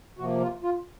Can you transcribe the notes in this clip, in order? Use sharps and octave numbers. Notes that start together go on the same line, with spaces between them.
C3 F3 A#3 F#4
F4
F4